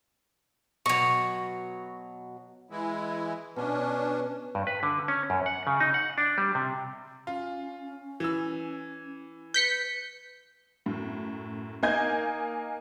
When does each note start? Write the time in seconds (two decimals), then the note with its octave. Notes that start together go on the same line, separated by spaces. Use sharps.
0.86 B2 F#3 C#6
2.70 E3 G#3 E4
3.56 B2 C#4 D4
4.55 G2
4.67 B4
4.83 D3
5.08 C#4
5.30 F#2
5.46 F#5
5.67 C#3
5.80 D#4
5.94 F#5
6.18 D4
6.38 G3
6.55 C3
7.27 C#4 F4
8.20 E3 E6
9.54 B4 G6 B6 C#7
10.86 F#2 A2
11.83 A#3 D#4 D#5 G#5 G6 G#6